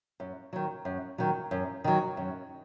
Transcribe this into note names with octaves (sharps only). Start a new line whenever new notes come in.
F#2
D#3 F#3
F#2
D#3 F#3
F#2
D#3 F#3
F#2